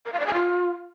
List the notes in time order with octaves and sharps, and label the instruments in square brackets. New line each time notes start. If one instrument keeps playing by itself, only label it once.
[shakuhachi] A#4
F5
D5
G#5
F4